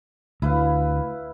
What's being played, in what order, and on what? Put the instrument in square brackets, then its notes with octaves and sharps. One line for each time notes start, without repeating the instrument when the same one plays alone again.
[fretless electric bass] D2 [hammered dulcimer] E4 B4 F5